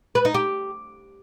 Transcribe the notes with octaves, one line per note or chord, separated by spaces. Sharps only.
B4
D#4
G4